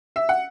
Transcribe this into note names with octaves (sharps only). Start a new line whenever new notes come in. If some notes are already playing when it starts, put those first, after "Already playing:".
E5
F#5